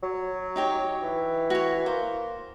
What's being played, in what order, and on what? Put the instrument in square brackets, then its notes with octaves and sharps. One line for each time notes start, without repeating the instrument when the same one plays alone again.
[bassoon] F#3
[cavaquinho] D#4 G4 C#5
[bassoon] E3
[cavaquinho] F#4 C#5
[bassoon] A#3 [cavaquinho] C5